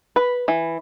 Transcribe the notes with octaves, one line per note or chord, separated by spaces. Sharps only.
B4
E3